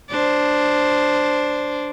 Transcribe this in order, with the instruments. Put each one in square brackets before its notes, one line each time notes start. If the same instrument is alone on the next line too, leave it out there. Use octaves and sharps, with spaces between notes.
[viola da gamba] D4 C5